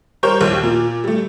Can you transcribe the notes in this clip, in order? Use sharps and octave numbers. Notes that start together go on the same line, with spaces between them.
G3 A#4 C5 C#5 C#6 G6
A#1 D#2
A#2
G3 A3